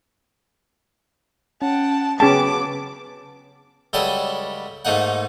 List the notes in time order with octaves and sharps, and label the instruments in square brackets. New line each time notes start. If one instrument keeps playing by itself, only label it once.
[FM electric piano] C#4 [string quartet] F#5 G5 [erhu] A5
[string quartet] C#3 F#3 B3 [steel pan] C#4 A5 [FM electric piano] G#4 G5 [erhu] D6
[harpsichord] C#2 F#3 G3 G4 A4 D#6
G#2 A3 A#3 D#4 F#5